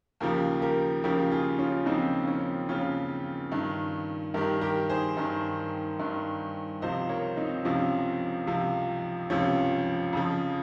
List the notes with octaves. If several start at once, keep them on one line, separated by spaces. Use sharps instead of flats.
D#2 C#3 F3 G4 A#4
G4 A#4
D#2 C#3 F3 G4 A#4
F4 G#4
C#4 F4
D#2 C#3 F3 C4 D#4
C#4
D#2 C#3 F3 C#4 F4
G2 D#3
G2 D#3 G4 A#4
G4 A#4
G#4 C5
G2 D#3
G2 D#3
C#2 C3 F3 C5 D#5
A#4 C#5
C4 D#4
C#2 C3 F3 C#4
C#2 C3 F3
C#2 C3 F3 C#4
F2 C#3 F3